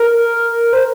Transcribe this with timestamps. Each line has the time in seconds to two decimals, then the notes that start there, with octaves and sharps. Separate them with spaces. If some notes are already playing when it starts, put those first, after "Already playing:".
Already playing: A#4
0.73 C5